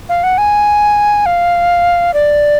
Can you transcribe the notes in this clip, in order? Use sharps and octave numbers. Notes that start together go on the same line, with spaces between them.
F5
F#5
G#5
F5
D5